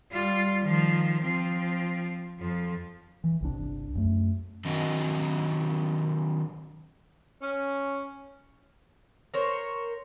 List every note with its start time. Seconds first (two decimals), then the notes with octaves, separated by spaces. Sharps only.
0.12 G3 F4
0.62 D#3 F3
1.22 F3 C4
2.39 F2 F3
3.24 E3
3.41 G1 C2 D4
3.95 F#2 A3
4.65 D#3 F#3 C4 D4 D#5
7.41 C#4
9.34 A#4 C5 C#5